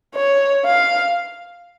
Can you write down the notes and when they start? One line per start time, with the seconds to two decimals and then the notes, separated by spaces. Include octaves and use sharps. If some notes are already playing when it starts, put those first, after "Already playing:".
0.15 C#5
0.66 F5